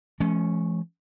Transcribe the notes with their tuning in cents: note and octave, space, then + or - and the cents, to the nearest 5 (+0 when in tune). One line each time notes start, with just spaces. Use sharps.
F3 -45 A3 -45 C#4 -10